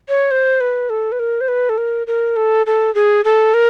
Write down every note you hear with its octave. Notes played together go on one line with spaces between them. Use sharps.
C#5
C5
B4
A4
B4
A#4
C5
B4
A4
A#4
A#4
A4
A4
G#4
A4
A#4